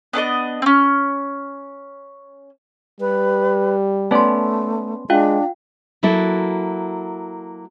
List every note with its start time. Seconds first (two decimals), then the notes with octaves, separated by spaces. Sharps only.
0.13 B3 D4 A4 D#5
0.62 C4 C#4
3.01 G3 B4
4.11 A3 B3 C#4 D5 A5 C6
5.10 G#3 D4 F4 F5 G5
6.03 F#3 A#3 E4 F#4 A4